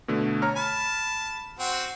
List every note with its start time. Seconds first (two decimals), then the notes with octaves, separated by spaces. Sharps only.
0.08 B2 D3 A3
0.42 C#5 A#5 F6
0.56 A5 B5
1.59 C4 F#4